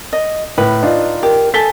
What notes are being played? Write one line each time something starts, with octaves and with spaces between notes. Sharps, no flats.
D#5
A2 B4
D4 D#4 F4
G4 A#4
A4 G#5 B6 G7